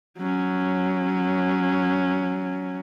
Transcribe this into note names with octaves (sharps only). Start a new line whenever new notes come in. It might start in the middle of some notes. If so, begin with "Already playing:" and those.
F#3 C#4